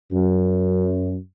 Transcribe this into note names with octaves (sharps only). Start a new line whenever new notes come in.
F#2